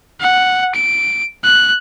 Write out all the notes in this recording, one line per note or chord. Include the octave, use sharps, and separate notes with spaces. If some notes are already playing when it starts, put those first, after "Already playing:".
F#5
D7
F#6